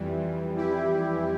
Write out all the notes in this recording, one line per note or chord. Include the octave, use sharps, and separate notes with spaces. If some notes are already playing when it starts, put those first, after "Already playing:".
Already playing: F2 E3 G3
E4 G4